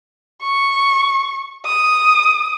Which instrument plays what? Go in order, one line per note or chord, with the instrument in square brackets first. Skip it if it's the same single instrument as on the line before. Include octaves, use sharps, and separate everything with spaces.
[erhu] C#6
D#6